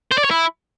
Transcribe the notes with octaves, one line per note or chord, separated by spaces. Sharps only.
C5
D5
C#5
E4